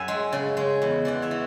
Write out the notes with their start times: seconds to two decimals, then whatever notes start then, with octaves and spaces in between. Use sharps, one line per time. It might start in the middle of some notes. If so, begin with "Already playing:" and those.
Already playing: F#2 E5 F#5 G#5
0.08 G#3
0.33 C#3
0.57 G#3
0.82 E2
1.05 E3 D5 F#5
1.22 C#5 E5
1.31 E3